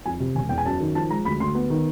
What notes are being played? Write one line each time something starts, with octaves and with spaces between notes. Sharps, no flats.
F2 G#5
C3
E1 G#5
E2 G5
G#5
F#2 A5
D#3
F3 A5
G#3 A#5
D2 B5
D2 C6
B3
D#3